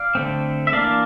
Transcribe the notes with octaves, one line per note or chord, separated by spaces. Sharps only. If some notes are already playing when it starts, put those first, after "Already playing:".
Already playing: D5 F5
D3 A3 C4
E5
E3 A#3 D4 D5 F5